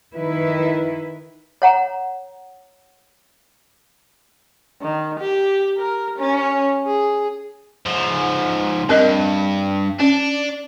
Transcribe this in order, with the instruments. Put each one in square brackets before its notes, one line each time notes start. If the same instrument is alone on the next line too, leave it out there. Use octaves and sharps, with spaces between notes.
[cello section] D#3 E4 B4
[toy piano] C#5 F#5 A#5
[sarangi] D#3
G4
A#4
C#4
G#4
[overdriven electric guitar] G#2 F3
[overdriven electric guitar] G2 [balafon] C4 A#4 D#5
[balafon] C#4 [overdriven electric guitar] D4